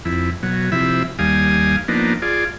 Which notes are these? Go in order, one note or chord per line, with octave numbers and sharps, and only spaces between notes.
F2 E4
B2 F#3
C3 F3 E4 E5 B5
D#2 G3 F5 G#5 D#6
F3 A#3 B3 D4 D#4
F4 G#4 D5